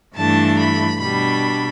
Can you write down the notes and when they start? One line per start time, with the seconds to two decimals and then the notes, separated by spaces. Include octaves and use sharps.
0.15 G2 E3 A3 D4 A5
0.58 B5
1.00 B2 G3 D4 B5